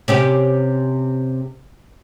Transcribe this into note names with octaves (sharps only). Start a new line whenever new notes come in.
C3 C#4 G4